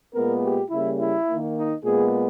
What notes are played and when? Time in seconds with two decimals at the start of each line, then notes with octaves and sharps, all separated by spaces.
0.13 A#2 G#3 B3 A#4
0.42 G4
0.70 C#3 G3 A#3 E4
0.99 E4
1.27 D#3 A#3
1.55 D#4
1.83 A#2 G#3 B3 G#4